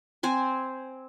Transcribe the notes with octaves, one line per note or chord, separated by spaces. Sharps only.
C4 C5 G#5